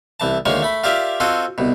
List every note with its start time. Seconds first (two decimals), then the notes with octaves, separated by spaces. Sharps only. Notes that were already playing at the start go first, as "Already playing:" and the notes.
0.20 C2 E3 A5
0.45 D2 D#3 G#3 A#3 C#5 C6
0.62 A3 B5
0.84 F4 G4 A#4 D5 E5
1.20 C4 F4 F#4 A4 D#5
1.58 C2 B2